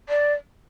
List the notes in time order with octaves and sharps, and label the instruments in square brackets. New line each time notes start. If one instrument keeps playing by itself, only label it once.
[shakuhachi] D5